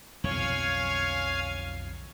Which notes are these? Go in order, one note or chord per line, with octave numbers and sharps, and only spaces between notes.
B1 F2 D3 C#5 F5 G#5